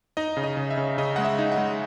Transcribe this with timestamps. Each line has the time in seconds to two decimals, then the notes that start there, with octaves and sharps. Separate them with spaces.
0.17 D#4 D#5
0.37 C#3
0.44 D#5
0.57 C#3
0.71 E5
0.77 C#3
0.98 C#3 D#5
1.16 G#3 F#5
1.25 E5
1.39 D#4
1.52 F#5
1.58 G#3